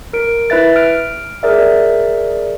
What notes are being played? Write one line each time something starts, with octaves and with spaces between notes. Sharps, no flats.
A#4 D7
E4 B4 E5 A6
F6 D7
G#4 A#4 D5 E5